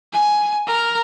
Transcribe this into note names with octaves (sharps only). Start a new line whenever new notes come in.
G#5
A#4